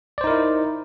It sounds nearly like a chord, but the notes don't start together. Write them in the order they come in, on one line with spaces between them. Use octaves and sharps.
D5 C5 D#4 A#4 E4